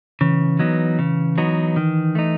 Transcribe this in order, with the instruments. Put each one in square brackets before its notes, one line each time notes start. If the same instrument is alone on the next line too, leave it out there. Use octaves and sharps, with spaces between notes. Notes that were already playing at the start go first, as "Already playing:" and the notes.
[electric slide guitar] C#3 [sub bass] E3
[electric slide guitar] F#3 B3 D#4
C#3
F#3 B3 D#4
D#3
A3 D#4